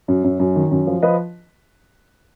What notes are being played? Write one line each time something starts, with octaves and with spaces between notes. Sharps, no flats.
F#2
F#2
F#2
D#3
F#2
F3
F3 B4 D#5